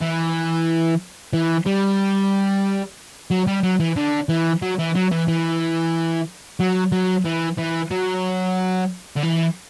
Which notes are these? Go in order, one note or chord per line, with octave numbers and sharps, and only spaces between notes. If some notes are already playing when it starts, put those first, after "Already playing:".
E3
E3
G3
F#3
G3
F#3
E3
D3
E3
F#3
E3
F#3
E3
E3
F#3
F#3
E3
E3
F#3
D3
E3